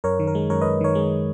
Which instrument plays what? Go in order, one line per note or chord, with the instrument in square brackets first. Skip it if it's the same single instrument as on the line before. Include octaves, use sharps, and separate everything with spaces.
[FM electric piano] F#2 A#4 C#5
D#3
A#4
G#3
F#2 A#4 C#5
B4 D#5
F#2
D#3 A#4 C#5
G#3